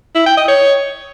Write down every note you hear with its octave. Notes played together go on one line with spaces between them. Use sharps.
E4
G5
D#5
C#5